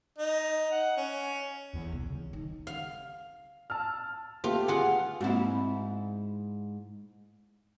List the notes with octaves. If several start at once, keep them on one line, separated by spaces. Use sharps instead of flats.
D#4
F#5
C#4
E2
C2
C#2
D#3
F5
A5 E6 F6
A3 B3 F4 G4
F4 G#4 F#5
G#2 A#3 C4 E4 F#4